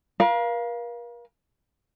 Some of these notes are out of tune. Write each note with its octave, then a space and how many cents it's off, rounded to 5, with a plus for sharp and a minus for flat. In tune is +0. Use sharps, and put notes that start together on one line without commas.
A#4 +40 F5 -5